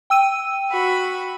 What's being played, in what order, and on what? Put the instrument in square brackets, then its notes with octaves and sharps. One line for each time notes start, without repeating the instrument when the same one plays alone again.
[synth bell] G5 E6 D#7
[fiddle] F#4 B5